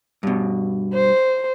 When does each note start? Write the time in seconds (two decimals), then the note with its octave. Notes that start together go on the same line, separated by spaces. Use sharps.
0.23 G2 B2
0.94 C5